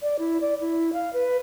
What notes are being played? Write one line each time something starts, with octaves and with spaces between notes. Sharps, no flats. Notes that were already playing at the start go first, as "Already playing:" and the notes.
D5
E4
D5
E4
F5
B4